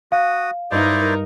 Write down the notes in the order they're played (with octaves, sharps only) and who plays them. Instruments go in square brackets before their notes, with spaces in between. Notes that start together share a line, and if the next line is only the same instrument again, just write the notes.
[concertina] F#4 D#6 [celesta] F5
[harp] G2 [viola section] D#4 A#4 [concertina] E4 C5 D5